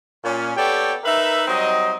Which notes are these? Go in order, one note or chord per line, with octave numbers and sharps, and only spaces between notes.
A#2 C#4
B3 G4 A4 C#5 D5 G5
D#4 A#4 B4 E5
F#3 G3 C4 D#4 D#5